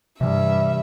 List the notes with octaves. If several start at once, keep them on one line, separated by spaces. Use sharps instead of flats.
G2 C3 E3 G3 E5